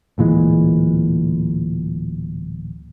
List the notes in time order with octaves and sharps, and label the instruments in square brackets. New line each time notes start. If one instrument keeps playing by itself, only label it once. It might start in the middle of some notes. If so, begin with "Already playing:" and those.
[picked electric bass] D1 A#2 E3 G#3